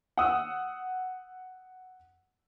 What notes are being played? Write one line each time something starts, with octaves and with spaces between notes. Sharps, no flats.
F#5 D#6 E6